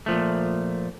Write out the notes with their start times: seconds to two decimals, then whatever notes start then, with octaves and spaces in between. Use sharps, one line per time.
0.06 A#2 F3 A3